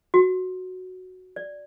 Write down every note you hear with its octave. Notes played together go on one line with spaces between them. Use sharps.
F#4
D5